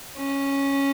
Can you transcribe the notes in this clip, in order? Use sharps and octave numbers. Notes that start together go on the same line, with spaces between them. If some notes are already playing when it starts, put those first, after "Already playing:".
C#4